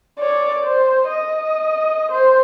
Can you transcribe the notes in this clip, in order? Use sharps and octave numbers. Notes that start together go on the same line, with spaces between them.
C#5 D5
C5
D#5
C5